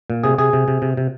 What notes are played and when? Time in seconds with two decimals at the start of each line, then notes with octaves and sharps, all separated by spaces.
0.10 A#2
0.24 C3 G#4
0.38 C3 G#4
0.53 C3
0.68 C3
0.82 C3
0.97 C3